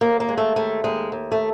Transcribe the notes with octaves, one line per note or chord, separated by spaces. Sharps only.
D#2 A#3
A#3
G#3
A3
D#2 A3
D#2 G#3
D#2
A3